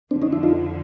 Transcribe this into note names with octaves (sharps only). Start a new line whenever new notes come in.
F2 D3 F3 C4 D4
C#4 D#4
D4 E4
D#4 F4